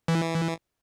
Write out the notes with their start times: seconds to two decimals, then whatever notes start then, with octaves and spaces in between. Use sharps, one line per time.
0.08 E3